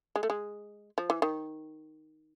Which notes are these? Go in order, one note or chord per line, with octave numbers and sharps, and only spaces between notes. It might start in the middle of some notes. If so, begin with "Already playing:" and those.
G#3
A3
G#3
F3
E3
D#3